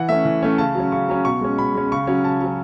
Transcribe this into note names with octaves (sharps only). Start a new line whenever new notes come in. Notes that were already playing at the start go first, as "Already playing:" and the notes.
Already playing: E3 F#5
A3 C#4 E5
E3
A3 C#4
C#3 A5
F#3 C#4
C#3 C#6
F#3 C#4
B2 C#6
G#3 C#4
B2 B5
G#3 C#4
C#3 C#6
F#3 C#4
C#3 A5
F#3 C#4